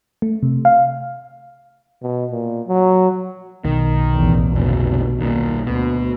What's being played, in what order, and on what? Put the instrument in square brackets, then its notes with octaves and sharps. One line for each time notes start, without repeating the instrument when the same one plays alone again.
[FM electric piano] A3
C3
F5
[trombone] B2
A#2
F#3
[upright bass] B1 [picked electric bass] D#3
[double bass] A1 E2
[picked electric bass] F1 D2 [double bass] B2
[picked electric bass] D#2 A#2
[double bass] D2 [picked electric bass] B2